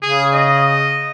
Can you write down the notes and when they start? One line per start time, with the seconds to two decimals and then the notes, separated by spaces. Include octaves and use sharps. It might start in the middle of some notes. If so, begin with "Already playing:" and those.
0.03 C#3 G#4
0.33 D#5